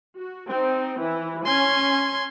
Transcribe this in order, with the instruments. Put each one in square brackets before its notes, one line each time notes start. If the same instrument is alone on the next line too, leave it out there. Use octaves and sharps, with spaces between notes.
[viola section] F#4
C4 D#4
E3 E4
[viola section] C#4 G#5 [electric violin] C6 G#6